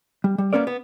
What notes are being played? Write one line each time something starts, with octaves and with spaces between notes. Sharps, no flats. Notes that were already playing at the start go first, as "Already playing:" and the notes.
G3
G3
A#3 B3 C#4 A#4 D5
B3